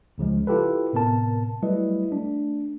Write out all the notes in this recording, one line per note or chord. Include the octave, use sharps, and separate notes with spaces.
C#2 C#3 F3 G#3
E4 F4 G4 A4 B4
A2 C3 B3 A#4 A5
F#3 G3 A3 E4 B4 D#5
A3 D4